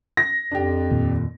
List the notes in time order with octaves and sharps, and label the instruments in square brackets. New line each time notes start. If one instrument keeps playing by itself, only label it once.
[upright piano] A#6
[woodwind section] F2 [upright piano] D4 G4
[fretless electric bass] D#2 A#2